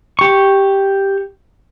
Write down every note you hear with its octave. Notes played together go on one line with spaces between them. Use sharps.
G4 C#6